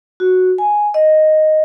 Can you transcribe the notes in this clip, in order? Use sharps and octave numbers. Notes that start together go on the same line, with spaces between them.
F#4
G#5
D#5